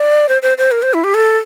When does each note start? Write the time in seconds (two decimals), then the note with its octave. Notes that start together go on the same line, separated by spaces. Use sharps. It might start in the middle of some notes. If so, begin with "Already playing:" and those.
Already playing: D5
0.29 C5
0.42 C5
0.58 C5
0.72 A#4
0.82 C5
0.94 E4
1.04 G4
1.14 A4